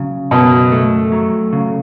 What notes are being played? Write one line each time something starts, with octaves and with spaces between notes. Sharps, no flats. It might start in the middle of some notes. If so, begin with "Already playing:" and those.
Already playing: C#3 F#3
F#2 B2
A3
F#3
C#3